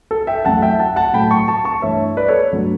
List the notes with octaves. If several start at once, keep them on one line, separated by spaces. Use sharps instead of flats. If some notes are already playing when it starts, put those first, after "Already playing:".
A4
E5 G5
F#2 E3 A3 F#5 A5
E5 G5
F#5 A5
F#5 A5
A2 F#3 A3 G5 B5
A5 C#6
A5 C#6
A5 C#6
G2 E3 A3 C#5 E5
B4 D5
A4 C#5
G2 F#3 A3